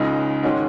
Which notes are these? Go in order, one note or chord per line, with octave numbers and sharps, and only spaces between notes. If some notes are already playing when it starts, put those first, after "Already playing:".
Already playing: C#2 C#3 G#3 D#4
G#2 D#3 G#3 C#4